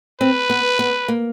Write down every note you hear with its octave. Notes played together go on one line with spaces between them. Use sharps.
C4 B4
B3
B3
A#3